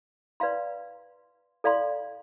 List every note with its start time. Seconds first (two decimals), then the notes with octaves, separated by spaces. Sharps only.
0.40 B4 D5 F5 C6
1.64 A4 D5 F5 C6